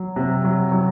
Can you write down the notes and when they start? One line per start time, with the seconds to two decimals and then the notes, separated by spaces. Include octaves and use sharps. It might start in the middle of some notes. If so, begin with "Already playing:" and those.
Already playing: F#3
0.16 C3
0.45 F#3
0.72 F#3